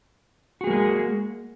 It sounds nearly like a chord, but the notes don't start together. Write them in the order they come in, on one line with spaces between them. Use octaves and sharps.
F#4 G#4 A#3 G#3